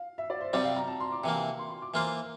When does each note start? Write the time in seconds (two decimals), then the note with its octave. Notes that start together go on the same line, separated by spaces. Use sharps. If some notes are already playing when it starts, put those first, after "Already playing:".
Already playing: F5
0.18 E5
0.30 D5
0.41 C5
0.53 C3 G3 C4 D5
0.64 F5
0.76 A#5
0.88 A5
1.00 C6
1.12 D6
1.24 C3 E3 A#3
1.59 C6
1.70 C6
1.82 D6
1.94 E3 A#3 F4 C5